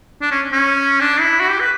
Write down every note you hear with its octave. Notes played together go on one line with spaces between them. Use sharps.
D4
C#4
C#4
D4
E4
F#4
G4
B4